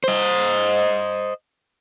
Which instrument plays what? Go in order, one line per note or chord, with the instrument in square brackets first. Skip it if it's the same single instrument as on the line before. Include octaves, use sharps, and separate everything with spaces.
[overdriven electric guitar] C5 D#5